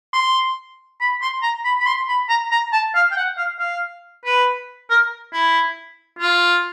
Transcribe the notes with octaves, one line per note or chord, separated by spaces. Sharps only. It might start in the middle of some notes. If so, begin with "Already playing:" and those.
C6
B5
C6
A#5
B5
B5
C6
B5
A#5
A#5
A5
F5
G5
F#5
F5
F5
B4
A#4
E4
F4